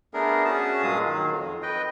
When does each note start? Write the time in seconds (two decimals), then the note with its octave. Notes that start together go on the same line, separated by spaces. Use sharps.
0.14 A3 B3 D4 G#4 A#4
0.45 C#4 F#4 G#4 A5
0.83 G2 A#2 F#3 G#3 F5 D#6
1.04 D#3 F#3
1.30 F2
1.63 B4 D#5 G5